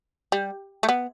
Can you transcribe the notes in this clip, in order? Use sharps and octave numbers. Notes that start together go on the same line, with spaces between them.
G3
A3
B3